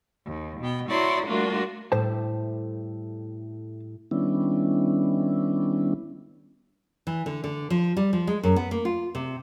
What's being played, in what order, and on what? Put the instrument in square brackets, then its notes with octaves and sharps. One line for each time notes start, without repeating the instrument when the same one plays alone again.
[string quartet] D#2
B2 B3 G5
E4 F#4 C#5 D5 A#5 C6
G3 A3 A#3 D4 F4 F#4
[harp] A2 G3 A3 [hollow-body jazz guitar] C5 A5
[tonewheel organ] D#3 G3 B3 C#4 D4 E4
[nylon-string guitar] E3
D3
D3
F3
G3
F3
G#3
F#2
B3
A#3
F4
C3